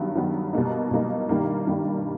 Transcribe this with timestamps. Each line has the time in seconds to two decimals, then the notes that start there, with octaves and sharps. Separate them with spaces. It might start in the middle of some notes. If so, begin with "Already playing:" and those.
Already playing: G2 D#3 F#3 B3
0.15 G2 D#3 F#3 B3
0.53 B2 G3 A#3 D#4
0.91 B2 G3 A#3 D#4
1.29 G2 D#3 G3 A#3
1.67 G2 D#3 G3 A#3